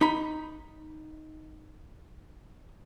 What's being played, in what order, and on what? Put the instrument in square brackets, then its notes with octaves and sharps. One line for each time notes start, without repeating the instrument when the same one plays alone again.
[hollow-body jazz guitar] D#4 B5